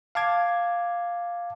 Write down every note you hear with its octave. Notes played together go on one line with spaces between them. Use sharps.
F5 A5 D6 G#6